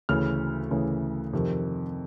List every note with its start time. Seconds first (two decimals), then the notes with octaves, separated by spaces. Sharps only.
0.09 D2 C#3 E3 F6
0.71 D2 C#3 E3
1.33 F2 C3 D#3